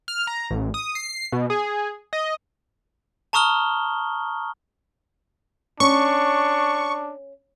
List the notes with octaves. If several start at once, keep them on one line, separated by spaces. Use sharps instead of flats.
F6
A#5
A1
D#6
C7
B2
G#4
D#5
A5 A#5 C#6 D#6 F6 G7
C#4 D4 C#6